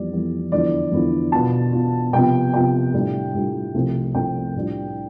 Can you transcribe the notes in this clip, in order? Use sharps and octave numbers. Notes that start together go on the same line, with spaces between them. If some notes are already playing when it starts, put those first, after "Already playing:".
Already playing: F2 E3 G3 B3 D5
F2 E3 G3 B3
E2 D3 F3 B3 E4 D5
E2 D3 F3 B3 E4
B2 B3 F4 A5
B2 B3 F4
C3 F3 B3 F4 G5
C3 F3 B3 F4 G5
A2 G3 D4 F4
A2 G3 D4 F4
C2 C3 F3 A3 C4
C2 C3 F3 A3 C4 G5
A2 G3 D4 F4